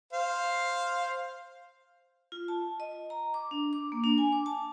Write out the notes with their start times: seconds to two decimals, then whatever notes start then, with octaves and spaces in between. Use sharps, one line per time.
0.13 C5 F5
2.32 F4
2.48 A5
2.80 D#5
3.10 A#5
3.34 D6
3.51 D4
3.73 D6
3.92 A#3
4.04 D4
4.18 G#5
4.32 D6
4.46 A5